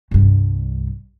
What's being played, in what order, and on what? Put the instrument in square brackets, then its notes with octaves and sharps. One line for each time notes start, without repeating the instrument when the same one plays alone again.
[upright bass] C2 G2